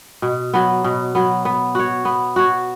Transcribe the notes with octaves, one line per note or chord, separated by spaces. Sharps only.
B2
F#3 B3
B2
F#3 B3
B3
F#4 C#5
B3
F#4 C#5